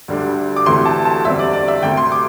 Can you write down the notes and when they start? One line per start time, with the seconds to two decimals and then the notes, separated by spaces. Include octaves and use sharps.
0.08 D2 D3 G3 D4
0.56 D6
0.66 D2 C3 E3 A3 C4 C6
0.85 A5
1.05 A5
1.25 E2 D3 G3 C4 E5
1.39 D5
1.53 D5
1.68 E5
1.83 D2 C3 A3 C4 G5
1.97 C6
2.12 D6